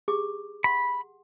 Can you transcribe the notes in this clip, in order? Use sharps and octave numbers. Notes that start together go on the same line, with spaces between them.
G4 G#4 D6
F#5 B5 C6